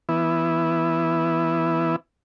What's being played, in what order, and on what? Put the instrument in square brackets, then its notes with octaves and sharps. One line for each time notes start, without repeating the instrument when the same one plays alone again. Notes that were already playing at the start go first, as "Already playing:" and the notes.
[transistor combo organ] E3 B3 E4